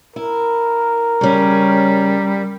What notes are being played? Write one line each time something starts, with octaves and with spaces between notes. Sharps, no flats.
E4 A#4
C#3 G3 C#4